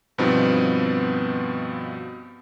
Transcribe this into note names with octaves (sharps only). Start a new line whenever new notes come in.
G2 B2 F3 B3 C4 D#4